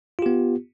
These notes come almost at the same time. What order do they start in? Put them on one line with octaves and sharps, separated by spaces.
F4 G4 B3